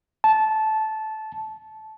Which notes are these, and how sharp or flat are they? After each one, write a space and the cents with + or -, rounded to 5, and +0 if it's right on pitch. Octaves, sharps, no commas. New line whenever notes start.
A5 -15